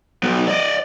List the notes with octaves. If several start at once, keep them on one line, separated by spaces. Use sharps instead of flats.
F#3 B3
D5 D#5